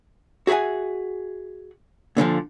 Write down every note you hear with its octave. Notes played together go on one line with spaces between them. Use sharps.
F#4 G#4 E5 F#5 G#5
A#2 D3 E3 F3